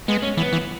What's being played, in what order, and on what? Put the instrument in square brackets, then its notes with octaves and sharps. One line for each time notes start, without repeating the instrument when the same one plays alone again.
[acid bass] G#3 [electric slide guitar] B3
[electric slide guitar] C#4
[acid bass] E3 [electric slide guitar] B3
[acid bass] E3